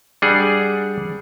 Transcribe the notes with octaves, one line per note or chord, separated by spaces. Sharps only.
G3 D4 G#4 F#5